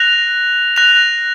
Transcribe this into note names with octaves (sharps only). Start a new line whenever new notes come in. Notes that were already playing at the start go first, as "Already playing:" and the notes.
Already playing: F#6 A#6 F7
F#6 A#6 F7